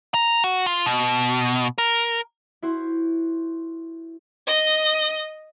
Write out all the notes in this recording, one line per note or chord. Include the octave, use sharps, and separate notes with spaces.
A#5
F#4
F4
B2
A#4
E4 F#4 C5
D#5